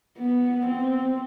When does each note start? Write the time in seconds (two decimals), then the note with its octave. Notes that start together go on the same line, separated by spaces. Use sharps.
0.18 B3
0.66 C4